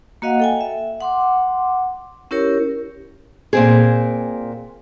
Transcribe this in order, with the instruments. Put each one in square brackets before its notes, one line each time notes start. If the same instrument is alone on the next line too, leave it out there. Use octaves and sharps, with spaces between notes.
[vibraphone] A#3 F#4 D#5 F5 F#5
A4 G5 G#5
E5
F#5 C6 D6
C#4 E4 G4 A#4 C#5
[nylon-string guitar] A#2 C4 G#4